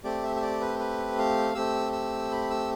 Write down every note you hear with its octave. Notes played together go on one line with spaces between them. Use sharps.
A3 C4 G4 D5
E5
E5
D5
B4
B4
F5
A3 C4 G4 E6
E6
B5
E6